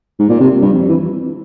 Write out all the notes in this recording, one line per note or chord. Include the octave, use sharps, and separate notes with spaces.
G#2
A#2
C3
G2
F2
E3